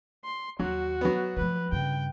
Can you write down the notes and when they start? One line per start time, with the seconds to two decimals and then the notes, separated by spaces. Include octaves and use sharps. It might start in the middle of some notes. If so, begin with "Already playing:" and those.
0.25 C6
0.59 D#2 F#3 F#4
1.01 F#3 B3
1.37 F3 A3 B4
1.72 G2 C#3 G5